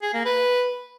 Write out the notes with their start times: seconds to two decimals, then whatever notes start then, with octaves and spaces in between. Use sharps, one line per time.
0.02 G#4
0.14 A#3
0.25 B4